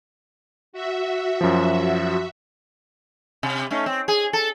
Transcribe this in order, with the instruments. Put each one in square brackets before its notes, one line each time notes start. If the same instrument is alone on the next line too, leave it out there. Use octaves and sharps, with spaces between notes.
[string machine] F#4 E5
[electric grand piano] F#2 F3
[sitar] C3
A3 C#4 D#4
C4
G#4
A4